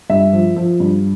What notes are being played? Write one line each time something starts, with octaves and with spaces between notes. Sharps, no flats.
G2 E5
F3
F3
G2